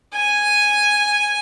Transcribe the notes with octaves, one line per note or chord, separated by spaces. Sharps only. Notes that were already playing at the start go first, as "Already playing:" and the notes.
G#5